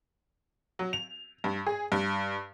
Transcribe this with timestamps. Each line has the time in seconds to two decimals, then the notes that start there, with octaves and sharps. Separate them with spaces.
0.79 F#3
0.93 F7
1.44 G2
1.67 G#4
1.92 G2